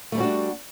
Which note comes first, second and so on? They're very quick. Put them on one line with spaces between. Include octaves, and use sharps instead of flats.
A3 G3 C#4 F#4 D4